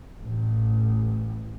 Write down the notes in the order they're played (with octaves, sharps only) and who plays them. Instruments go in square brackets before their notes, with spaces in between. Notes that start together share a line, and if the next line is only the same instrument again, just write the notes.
[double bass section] A1